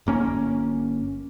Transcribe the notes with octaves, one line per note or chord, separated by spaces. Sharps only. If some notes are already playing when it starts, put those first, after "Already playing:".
G1 A#3 C#4